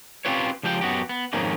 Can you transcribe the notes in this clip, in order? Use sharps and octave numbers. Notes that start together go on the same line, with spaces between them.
C4 C#4 F4 G4 B4 C#5
C#2 F3 G4 E5 G5
F#2 B3 F#4 G4
B3
F2 G#2 D#3 A#3 C#4 D#4